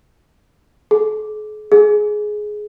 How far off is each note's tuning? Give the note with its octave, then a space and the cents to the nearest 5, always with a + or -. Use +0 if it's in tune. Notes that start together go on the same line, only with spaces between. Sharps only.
G#4 +45
G#4 +15